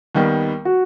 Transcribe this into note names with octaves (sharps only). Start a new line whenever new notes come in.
D#2 D#3 G3 B3
F#4